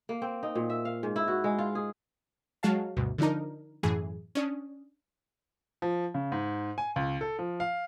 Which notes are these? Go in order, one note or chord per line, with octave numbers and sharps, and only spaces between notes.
A#3
C4
D#4
A#2
E5
F5
G#2
E4
F#4
G#3
F4
G#4
F#3 G#3 F#4 F5 A5
D2 G2 B2
D3 F3 D4 D#4 A#4
F#2 A2 E3 G#4
C#4 D4 D#6
F3
C#3
G#2
G#5
C#2
A4
F3
F5